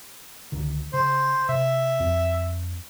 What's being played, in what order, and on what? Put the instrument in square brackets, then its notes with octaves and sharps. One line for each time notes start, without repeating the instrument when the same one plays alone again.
[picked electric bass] C#2 D3 D#3
[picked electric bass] C#3 [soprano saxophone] C5
[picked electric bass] C3 [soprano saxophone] E5
[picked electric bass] F2 C4